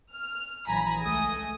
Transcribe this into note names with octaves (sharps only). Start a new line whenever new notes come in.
F6
A#1 E3 F#3 G#5 A#5 B5
C#2 A3 G#5 D#6 A#6